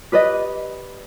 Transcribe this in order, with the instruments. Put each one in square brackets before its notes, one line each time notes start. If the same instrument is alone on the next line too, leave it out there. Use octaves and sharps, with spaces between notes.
[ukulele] G4 B4 D5 D#5